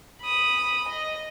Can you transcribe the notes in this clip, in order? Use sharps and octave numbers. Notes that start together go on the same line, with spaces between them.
B5 D#6
D#5